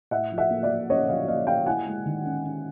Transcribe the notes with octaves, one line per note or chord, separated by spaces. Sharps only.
A2 E5 F#5
F3
E5 F#5
A#3
D5 E5
F3
C#4 C#5 D#5
F3 D#5 F5
A#3 D#5 F5
A#3 F5 G5
E4 F#5 G#5
G#3
D#3
C#4
C#4